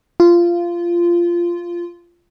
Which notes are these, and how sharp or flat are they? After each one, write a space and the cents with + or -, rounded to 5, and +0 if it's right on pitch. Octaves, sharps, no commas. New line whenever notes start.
F4 -15